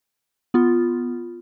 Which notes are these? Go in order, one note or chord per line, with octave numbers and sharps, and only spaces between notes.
B3 F4